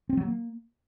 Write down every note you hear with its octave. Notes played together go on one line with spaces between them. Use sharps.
C4
F#3
A#3